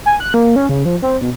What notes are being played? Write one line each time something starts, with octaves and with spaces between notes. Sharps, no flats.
G#5
F#6
A#3
C#4
C#3
F3
C4
B2